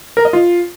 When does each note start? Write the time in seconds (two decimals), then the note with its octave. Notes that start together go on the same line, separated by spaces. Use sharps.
0.17 A#4
0.25 D#5
0.33 F4